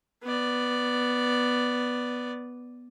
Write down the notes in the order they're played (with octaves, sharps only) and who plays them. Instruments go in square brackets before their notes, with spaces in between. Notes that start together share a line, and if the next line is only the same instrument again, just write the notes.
[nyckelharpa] B3 D5